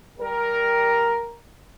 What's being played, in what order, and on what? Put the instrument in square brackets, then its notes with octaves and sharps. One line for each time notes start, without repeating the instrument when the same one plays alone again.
[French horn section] G3 A#4